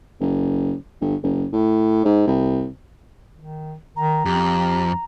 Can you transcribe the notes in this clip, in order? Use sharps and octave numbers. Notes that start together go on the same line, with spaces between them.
F#1
G1
F#1
A2
G#2
C2
D#3
D#3 A#5
F2 G4